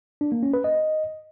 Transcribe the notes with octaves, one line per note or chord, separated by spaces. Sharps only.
D4
A#3
C#4
B4
D#5